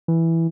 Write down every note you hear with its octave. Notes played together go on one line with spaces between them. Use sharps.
E3